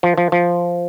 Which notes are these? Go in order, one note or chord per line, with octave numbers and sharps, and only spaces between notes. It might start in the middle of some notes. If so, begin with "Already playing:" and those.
F3
F3
F3